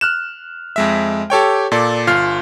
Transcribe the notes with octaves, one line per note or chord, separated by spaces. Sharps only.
F6 F#6 E7
F2 G#3 E5
G4 A4 C#5 G5
A#2 A4 D5
G1 F4 F6 C7